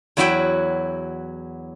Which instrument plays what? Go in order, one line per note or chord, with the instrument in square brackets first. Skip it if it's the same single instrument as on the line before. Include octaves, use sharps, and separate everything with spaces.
[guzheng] E2 F#3 E4 F#4 E5 G5